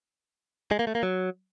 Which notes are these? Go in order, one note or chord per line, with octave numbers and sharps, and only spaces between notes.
G#3
A#3
A3
A#3
F#3